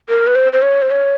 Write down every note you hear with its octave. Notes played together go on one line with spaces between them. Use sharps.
A#4
B4
C5
C5
C#5
C5
C#5